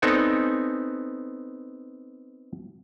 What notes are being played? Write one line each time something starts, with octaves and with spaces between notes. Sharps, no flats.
B3 C4 D#4 A4 D5 G#5